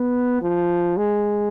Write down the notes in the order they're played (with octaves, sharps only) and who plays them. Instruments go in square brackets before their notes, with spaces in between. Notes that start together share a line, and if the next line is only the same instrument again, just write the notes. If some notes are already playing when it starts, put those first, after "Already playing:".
Already playing: [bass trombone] B3
F3
G#3